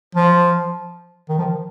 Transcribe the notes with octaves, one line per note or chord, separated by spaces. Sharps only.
F3
D#3
F3